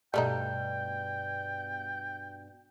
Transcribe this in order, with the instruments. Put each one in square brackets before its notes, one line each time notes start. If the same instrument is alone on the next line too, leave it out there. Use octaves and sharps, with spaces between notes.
[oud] G2 B2 [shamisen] G3 A3 D#4 [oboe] G5